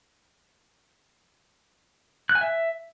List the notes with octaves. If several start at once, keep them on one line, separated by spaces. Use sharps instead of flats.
F#6
G#5
E5